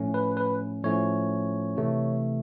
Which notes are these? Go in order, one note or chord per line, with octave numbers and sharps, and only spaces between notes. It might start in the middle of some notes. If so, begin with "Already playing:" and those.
Already playing: A2 F3 A3 C#4
B4
B4
A2 F3 A3 C#4 C#5
C3 E3 A3